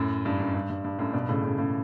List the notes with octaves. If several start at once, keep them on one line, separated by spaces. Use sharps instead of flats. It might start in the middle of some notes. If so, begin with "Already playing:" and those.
Already playing: F#2 A2
G2
F#2
G2
G2
G2
F#2 A2
G2 B2
A2 C#3
A2 C#3
A2 C#3